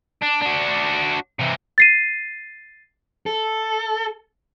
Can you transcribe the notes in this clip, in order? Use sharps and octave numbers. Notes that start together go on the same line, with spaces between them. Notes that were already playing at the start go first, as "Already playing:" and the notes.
D4
D4 F#4
C3 E3
A6 C7 D#7
A4